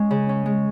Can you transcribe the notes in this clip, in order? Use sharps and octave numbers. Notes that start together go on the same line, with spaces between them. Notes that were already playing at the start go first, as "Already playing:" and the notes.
Already playing: G#3 C#4
C#3
C#4
G#3